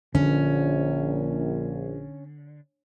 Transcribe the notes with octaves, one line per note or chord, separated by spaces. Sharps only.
A#1 D3 C#4